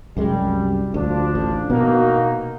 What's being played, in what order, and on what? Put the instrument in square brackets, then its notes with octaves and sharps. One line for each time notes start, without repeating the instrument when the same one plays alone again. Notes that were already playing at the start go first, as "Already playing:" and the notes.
[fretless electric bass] C2 F#2 G#3 [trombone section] G3
[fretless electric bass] D2 [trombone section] F3 D4
[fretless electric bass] A1
[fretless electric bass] B2 B3 [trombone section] A#3 D#4 F#4